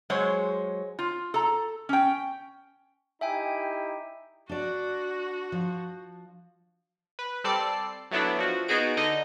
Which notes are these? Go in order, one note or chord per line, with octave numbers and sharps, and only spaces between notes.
F#3 G#3 C5 C#5
F4
A4 A#5
C#4 G5
D#4 E4 G4 E5 G5 G#5
D4 F#4 D5
F3
B4
G3 C4 A4 D5 C7
F#3 A3 B3 D4 E4
F3 F#4
B3 D#4 F#4 G#4 D7
D3 D#4 D#5